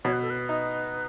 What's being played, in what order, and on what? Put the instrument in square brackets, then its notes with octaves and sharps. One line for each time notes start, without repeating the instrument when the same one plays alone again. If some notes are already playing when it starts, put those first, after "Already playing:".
[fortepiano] B2 [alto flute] C#5
[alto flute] B4
A4
B4
[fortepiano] D#4